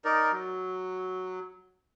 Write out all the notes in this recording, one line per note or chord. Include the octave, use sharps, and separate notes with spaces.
D#4 A#4 D5
F#3